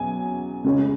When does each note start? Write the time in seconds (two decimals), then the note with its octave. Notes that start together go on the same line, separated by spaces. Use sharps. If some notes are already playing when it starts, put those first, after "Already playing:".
Already playing: E2 B2 F#3 C#4 G#5
0.64 C#2 C#3 G#3 C#4